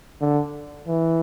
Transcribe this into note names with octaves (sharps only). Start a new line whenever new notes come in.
D3
E3